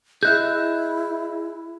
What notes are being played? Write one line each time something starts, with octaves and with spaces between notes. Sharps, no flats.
E4 G#4 D#5 E5 F#6 G6